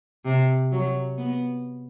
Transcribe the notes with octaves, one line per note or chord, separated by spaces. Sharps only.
C3
F#3
B3